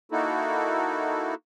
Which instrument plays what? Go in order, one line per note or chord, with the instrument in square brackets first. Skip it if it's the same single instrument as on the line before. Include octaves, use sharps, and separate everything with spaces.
[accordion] A#3 D#4 E4 F#4 A4